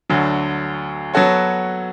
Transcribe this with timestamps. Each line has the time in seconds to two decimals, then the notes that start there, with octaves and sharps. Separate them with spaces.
0.09 D2 D3 F#3
1.14 F#3 B3 F#4 A4 C#5